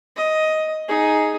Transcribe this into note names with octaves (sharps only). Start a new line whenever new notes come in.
D#5
D#4 G#4